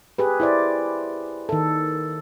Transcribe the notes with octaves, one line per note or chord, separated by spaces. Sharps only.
G4 G#4 B4
E4 C5 D5
D#3 A4